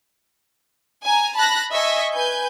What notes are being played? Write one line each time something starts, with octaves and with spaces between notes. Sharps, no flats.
G#5 A#5
A5 B5 F#6 A#6
D#5 E5 G#5 C#6
B4 G#5 G6